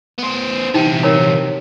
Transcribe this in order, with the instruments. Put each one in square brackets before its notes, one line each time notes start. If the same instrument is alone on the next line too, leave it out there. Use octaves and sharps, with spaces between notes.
[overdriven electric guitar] B3 C5
[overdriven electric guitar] E2 C3 [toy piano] D#4 G5
[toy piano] A#4 C#5 A#5